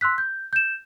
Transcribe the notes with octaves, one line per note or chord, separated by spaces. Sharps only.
C6 E6 F#6 B6
G6
G6 E7